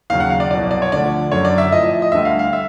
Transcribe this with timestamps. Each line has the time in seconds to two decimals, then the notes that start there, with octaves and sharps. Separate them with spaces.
0.10 D#2 C#3 F#3 F5
0.20 F#5
0.30 F5
0.40 D5
0.51 C2 B2 F#3 D5
0.71 D5
0.82 C#5
0.92 D2 D3 F3 D5
1.32 F#2 D3 F#3 C#5
1.45 D5
1.58 E5
1.72 A2 F3 D#5
1.83 E5
2.02 D#5
2.12 D2 D3 G3 E5
2.25 F5
2.39 F5
2.53 E5